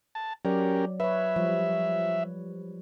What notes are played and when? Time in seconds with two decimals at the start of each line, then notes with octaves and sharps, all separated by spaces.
0.15 A5
0.45 F#3 C#4 G4 A#4 D5
1.00 B4 C#5 E5
1.36 F3 G3